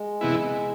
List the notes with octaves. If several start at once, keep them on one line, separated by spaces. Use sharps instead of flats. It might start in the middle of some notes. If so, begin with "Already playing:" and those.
Already playing: G#3
C3 E3 B3 E4